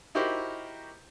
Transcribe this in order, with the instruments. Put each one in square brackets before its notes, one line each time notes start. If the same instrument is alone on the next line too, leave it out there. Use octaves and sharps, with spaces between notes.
[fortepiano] D#4 E4 F#4 G4 A#4 C5